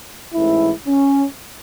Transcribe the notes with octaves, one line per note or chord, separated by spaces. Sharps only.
A1 G#2 E3 A3 E4
C#4